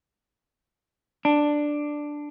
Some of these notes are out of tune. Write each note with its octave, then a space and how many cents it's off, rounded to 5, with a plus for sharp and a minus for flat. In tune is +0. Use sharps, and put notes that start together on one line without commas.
D4 +5